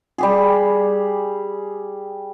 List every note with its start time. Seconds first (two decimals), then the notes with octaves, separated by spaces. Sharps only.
0.18 G3 G4 G#4